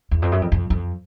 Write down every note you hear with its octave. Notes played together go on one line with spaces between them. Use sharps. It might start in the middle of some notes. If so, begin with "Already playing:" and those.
E2
F2
F#2
F2
F2
F2